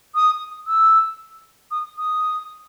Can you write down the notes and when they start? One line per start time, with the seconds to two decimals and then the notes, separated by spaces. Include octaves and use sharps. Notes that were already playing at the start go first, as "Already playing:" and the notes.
0.15 D#6
0.67 E6
1.71 D#6
1.98 D#6